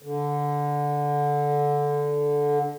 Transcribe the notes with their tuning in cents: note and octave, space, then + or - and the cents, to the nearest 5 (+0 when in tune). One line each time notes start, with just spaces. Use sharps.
D3 -10